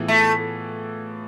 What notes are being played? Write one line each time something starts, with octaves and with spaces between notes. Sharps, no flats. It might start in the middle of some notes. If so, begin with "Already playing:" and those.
Already playing: A2 E3 B3 F4 G#4
A3